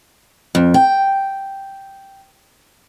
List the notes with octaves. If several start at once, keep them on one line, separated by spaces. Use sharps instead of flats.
F2
G5